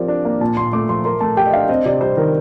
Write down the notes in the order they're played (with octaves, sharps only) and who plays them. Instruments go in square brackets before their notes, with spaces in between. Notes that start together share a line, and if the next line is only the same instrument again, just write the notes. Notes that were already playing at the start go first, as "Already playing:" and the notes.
Already playing: [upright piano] F3 C4 G4 [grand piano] A#4 D5
[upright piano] D4
A#3
[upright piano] A#2 [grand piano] A5
[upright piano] A#2 [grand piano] C6
[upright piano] A3 [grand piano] D6
[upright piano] F3 [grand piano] C6
[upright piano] A#4 [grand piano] C6
[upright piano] A3 [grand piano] A5
[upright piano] G4 [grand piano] G5
[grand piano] D#5
[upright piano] D4 [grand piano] F5
[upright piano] C4 [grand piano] D#5
[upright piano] C3 [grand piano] D5
[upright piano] G3 [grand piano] C5
[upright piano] D#3 [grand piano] A#4